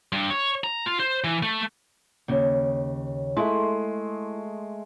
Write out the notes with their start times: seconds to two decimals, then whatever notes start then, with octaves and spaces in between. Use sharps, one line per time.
0.12 G2
0.30 C#5
0.64 A#5
0.86 F4
1.00 C5
1.24 E3
1.43 A3
2.28 D#2 C#3
3.37 G#3 A3 E4